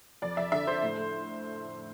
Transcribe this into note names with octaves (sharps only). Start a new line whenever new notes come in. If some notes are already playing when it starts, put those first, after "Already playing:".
F2 D5
F2 E5
D3 E5
D3 C5
A2
A3